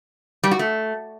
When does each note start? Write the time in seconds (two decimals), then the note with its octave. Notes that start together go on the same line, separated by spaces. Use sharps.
0.43 G3
0.51 F#4
0.59 A3